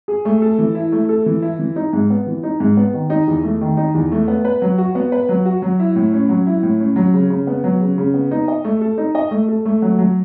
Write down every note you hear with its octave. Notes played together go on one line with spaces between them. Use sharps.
G#4
A3
A4
E3
E4
A3
A4
E3
E4
E3
D#4
G#2
B3
E3
D#4
G#2
B3
D#3
D#4
E2
A3
D#3
D#4
E2
A3
B3
B4
F#3
F#4
B3
B4
F#3
F#4
F#3
E4
A2
C#4
F#3
E4
A2
C#4
F#3
C#3
C#3
B3
F#3
C#3
C#3
B3
D#4
D#5
A3
A4
D#4
D#5
A3
A4
A3
F#3
F#3